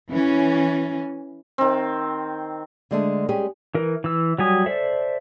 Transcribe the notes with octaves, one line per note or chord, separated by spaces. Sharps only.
E3 C#4
D#3 C4
D3 G#3 A3
G3 G#3 C#4 G4 G#4
E3 A#4
E3 E6
F#3 G3 G#5 D#6
A4 C5 D5 E5